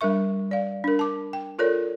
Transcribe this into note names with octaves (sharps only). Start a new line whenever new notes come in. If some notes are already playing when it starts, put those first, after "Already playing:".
G3 D4 A#4 E5 C#6
D5 F5
D4 A#4
A5 D6
G5
F4 A4 A#4 C#5 D5